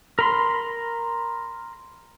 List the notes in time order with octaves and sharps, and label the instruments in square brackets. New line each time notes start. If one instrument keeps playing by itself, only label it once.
[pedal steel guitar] A#4 B5 C6